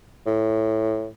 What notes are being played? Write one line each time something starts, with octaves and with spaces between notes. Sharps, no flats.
A2